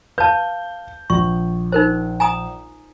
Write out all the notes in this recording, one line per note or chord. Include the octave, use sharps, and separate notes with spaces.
B4 F5 A5 G6
A#1 C#6
D#4 A#4 C5
G#5 A#5 D#6